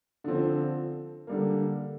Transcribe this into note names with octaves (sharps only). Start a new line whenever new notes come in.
D3 F3 C4
D3 G3 A#3